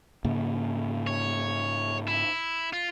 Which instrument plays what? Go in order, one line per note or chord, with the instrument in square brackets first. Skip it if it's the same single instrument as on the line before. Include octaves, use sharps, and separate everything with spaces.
[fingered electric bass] G#2 C#3 A#3
[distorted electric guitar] C#5
E4
F4